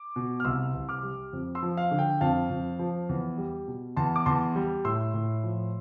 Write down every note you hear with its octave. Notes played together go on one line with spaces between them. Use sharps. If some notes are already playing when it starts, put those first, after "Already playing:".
Already playing: D6
B2
F6
C2 C6 E6
C2
D6 F6
G3
F2
C6 E6
F3
F5
D3
G5
F2 F5 A5
F2
F3
E2
G3
B2
E2 A5 C6
D6
E2 A5 C6
G3
A2 C6 E6
A2
F3